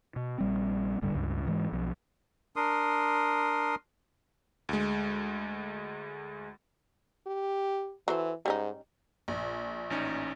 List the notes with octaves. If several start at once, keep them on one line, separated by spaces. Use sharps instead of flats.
B2
A#1 G3 C4
D1 G2 D3 G3
C#2 G2
G#2 E3 G#3
B1 F3
D4 A#4 C6 D#6
D2 G#3
G4
E3 F#3 A4 C5
G#2 G3 C#4 D#4
A#1
A1 C#4 D#4